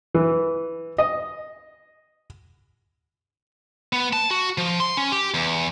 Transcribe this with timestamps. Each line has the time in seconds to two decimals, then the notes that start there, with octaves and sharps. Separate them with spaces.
0.15 E3
0.98 D#5
3.93 B3
4.13 A5
4.31 F#4
4.58 F3
4.80 C6
4.97 C#4
5.12 G4
5.34 E2